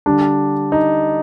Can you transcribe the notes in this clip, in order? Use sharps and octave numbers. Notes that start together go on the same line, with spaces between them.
D3 G3 D4
D#4